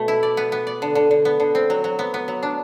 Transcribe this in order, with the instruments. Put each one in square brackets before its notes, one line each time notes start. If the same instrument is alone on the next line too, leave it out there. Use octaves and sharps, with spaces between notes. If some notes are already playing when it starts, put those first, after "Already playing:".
Already playing: [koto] B2 A3
E4
D5
B3
B3
D5
D3
D3
D3
B3
D3
C4
F#3
F#3
B3
B3
F#3
D4